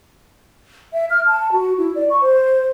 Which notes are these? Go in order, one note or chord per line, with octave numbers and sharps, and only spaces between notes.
E5
F6
A5
F#4
E4
D5
C#6
C5